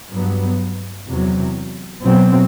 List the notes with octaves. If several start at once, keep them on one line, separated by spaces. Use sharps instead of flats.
G2 F#3 B3
E2 C3 F#3
B2 F#3 C4